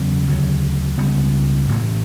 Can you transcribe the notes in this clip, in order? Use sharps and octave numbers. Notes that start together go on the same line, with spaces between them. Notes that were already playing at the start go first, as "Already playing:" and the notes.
Already playing: E2 C#3 F#3 B3
D2 C#3 F#3
C#2 C#3 G3 B3
A1 A2 E3 A3